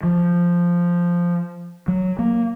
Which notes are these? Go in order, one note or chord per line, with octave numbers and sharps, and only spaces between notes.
F3
F#3
A#3